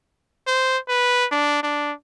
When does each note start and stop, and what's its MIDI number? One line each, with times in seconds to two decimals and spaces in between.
0.47 0.78 72
0.89 1.25 71
1.31 1.62 62
1.63 1.92 62